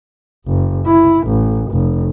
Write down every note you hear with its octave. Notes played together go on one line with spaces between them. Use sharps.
F#1
E4
A1
F1